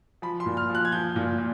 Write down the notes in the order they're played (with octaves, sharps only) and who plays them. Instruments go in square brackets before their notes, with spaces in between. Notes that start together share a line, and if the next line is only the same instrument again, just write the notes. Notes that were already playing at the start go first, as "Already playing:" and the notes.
[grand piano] F3 B5
C6
A#2
F6
F3 F#6
G#6
F3 G6
A#2
A#2